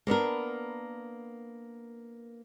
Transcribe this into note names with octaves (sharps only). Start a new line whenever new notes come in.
A#3 B3 D4 A#4